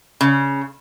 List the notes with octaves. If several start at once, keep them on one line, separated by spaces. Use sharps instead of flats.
C#3